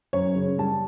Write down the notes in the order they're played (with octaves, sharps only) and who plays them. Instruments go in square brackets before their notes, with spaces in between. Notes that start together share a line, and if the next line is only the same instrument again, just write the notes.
[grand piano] F#2 C#5
C#3
G3 A5